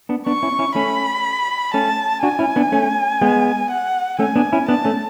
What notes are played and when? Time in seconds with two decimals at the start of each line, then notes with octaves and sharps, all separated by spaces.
0.09 B3 D4
0.26 B3 D4 C#6
0.43 C#4 E4
0.59 C#4 E4
0.75 A3 C#4 B5
1.74 A3 C#4 A5
2.23 D4 F#4 G#5
2.39 C#4 E4
2.56 B3 D4
2.72 A3 C#4
3.21 G#3 B3
3.71 F#5
4.19 A3 C#4 G#5
4.36 B3 D4
4.53 C#4 E4
4.68 B3 D4 A5
4.85 A3 C#4